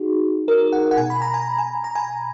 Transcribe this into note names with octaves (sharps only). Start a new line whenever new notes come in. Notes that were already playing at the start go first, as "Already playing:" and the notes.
Already playing: D#4 F#4 G#4
A#4
F#5
F#5
B2 G#5
B5
A#5
G#5
G#5
A#5
G#5